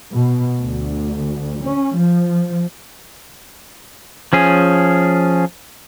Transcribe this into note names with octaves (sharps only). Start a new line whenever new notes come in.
B2
D2
C#4
F3
F3 C#4 G#4